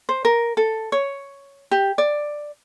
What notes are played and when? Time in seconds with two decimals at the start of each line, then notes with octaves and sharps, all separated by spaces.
0.09 C5
0.25 A#4
0.57 A4
0.92 C#5
1.71 G4
1.98 D5